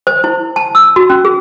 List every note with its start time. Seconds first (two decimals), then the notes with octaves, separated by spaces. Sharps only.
0.07 C5
0.24 E4
0.56 A5
0.75 E6
0.96 F#4
1.10 C#4
1.25 G#4